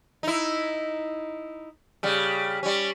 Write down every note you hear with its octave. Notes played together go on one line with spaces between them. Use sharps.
D#4 E4
C#3 G3
G3 C#4